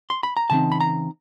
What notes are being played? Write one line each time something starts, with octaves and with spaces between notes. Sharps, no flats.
C6
B5
A#5
C#3 E3 C4 D#4 A5
B5
A#5